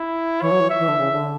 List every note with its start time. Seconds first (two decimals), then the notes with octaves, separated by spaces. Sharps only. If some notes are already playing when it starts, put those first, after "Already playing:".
Already playing: E4
0.42 E3 C#5
0.51 F#3
0.60 E3
0.70 E5
0.79 E3
0.88 D3
0.98 C#3
1.12 D3